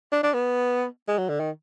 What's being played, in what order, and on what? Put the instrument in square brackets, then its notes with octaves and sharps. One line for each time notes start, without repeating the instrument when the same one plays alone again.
[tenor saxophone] D4
D4
B3
G#3
F#3
D3
D#3